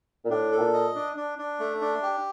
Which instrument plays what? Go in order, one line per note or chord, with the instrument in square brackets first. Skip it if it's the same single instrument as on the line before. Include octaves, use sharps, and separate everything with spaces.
[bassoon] A#2
[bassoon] A2 [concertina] D4
[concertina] A4
[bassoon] A#2
[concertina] D#5
D4
D4
D4
A3
D4
G4